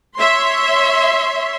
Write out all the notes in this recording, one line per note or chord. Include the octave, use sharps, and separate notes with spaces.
C#5 E5 C6